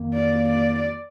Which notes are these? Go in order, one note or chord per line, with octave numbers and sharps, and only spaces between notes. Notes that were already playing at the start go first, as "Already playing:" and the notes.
Already playing: F2 D#3 A#3
D5
D5